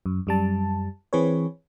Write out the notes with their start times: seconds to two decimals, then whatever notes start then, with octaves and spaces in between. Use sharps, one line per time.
0.06 F#2
0.27 F#2 G3 A5
1.13 E3 C4 G#4 B4 C#5